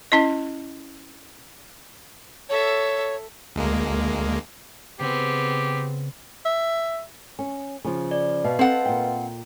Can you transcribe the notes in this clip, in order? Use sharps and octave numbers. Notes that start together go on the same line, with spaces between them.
C#4 E4 D#5
A4 C#5 E5
D2 G#3 A#3
C#3 B3 C4 G4
E5
C#4
C#3 F3 F4
D5
B2 B4 D#5 F5
C4 A4 F#5
A#2 G5